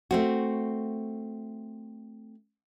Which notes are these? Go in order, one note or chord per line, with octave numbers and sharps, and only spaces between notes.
A3 C4 F#4